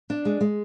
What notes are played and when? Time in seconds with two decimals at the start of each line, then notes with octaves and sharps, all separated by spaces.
0.10 D4
0.25 G#3
0.41 G#3